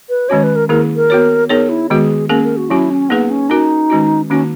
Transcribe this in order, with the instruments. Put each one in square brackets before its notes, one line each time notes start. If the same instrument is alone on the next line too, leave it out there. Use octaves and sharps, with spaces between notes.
[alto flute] B4
[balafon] D#3 G#3 C#4 F#4 [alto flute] C#5
[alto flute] B4
A#4
[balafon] D#3 A#3 E4 G#4 [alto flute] A#4
[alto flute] A#4
[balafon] B3 F#4 C#5
[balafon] B3 D#4 G#4 C#5 [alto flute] A#4
[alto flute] E4
[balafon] D#3 G#3 B3 F#4 [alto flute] G#4
[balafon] A#3 C#4 G#4 [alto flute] A#4
[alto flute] A#4
F#4
[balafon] F#3 C#4 F#4 [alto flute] E4
[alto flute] C#4
[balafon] A#3 D#4 G#4 B4 [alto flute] B3
[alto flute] C#4
[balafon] C#4 F#4 A#4 [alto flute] D#4
[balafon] D#3 G#3 C#4 F#4
[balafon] D#3 A#3 D#4 F#4 [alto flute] C#4